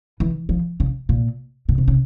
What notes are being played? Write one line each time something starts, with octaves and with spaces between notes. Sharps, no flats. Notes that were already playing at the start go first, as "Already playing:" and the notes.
E3
F3
C#3
A#2
B2
C3
C#3